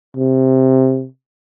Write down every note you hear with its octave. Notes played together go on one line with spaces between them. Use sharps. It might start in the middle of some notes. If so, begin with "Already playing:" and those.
C3